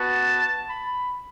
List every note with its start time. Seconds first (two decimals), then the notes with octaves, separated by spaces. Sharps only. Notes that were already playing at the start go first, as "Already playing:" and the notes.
Already playing: B3 F#4 A5
0.69 B5